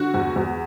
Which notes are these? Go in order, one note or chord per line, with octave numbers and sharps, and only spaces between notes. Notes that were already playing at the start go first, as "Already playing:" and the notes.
Already playing: D3 F#4
E2
E2